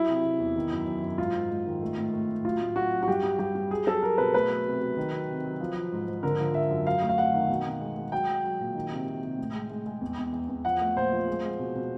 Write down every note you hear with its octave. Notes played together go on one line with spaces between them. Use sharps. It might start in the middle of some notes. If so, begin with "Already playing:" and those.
Already playing: F#3 E4
C3
C3
E2
D#3
F#2
F#2
F#2
G#2 F4
G#2
G#2
D#3
A3
A2
A3
A2
F#3 F4
A2
F#3 F#4
F#3
F#4
G2 G4
G3
G2 G4
G3
F#3 G#4
F#3 A4
F#3 A#4
B2 B4
A3 B4
F#3
C3
F#3
D#3
F#3
C3
F#3
F3
F3
G#2
G#2
D3 A#4
F3
F3 E5
F#2
F#3 F5
A3
F5
A3 F#5
D#3
B2
B2
G#3
G#3
F#3 G5
F#3
F#3
A#2
D#3
C3
C3
C3
A2
G#3
G#3
G#3
E2
E2
E2
E2
F3 F#5
A3
A#2 C5
F3
G#3
G#3
B2
B2